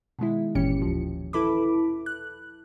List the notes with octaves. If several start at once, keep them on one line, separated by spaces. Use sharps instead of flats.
B2 D#3 G#3 E4
G1 A#2 E3 C#4 G4 C#7
D#2 F3
E4 A4 B4 B5 D6
F#6